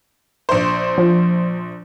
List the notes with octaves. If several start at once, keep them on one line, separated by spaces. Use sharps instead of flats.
A#1 C5
F3